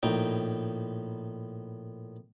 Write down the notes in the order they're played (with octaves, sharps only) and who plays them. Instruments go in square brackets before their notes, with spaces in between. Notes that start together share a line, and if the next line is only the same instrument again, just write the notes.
[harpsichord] A#1 A2 D#4 G5